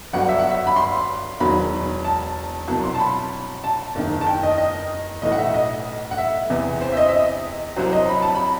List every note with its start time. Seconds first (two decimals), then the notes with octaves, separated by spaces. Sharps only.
0.13 G1 G2 F#3 F#5
0.29 E5
0.39 F#5
0.50 E5
0.67 B5
0.76 C6
1.40 E1 E2 D#3 F#3 B5
2.04 A5
2.67 C2 B2 F#3 A5
2.84 C6
2.95 A5
3.00 B5
3.64 A5
3.95 F#1 E2 D#3
4.21 A5
4.27 G5
4.43 D#5
4.58 D#5
5.22 B1 A2 E3 D#5
5.32 F#5
5.38 E5
5.54 D#5
6.11 F#5
6.18 E5
6.50 E2 C3 E3
6.81 C5
6.93 E5
6.97 D#5
7.08 E5
7.13 D#5
7.76 C2 C3 F#3 C5
7.93 D#5
8.09 B5
8.22 A5
8.35 B5